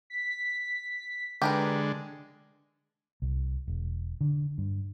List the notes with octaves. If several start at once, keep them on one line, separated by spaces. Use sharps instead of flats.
B6
D3 G#3 G4 A#4 B4
C2
E1
D3
G2